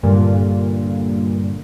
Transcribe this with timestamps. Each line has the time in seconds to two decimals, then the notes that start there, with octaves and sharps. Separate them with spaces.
0.03 G2 A#2 D3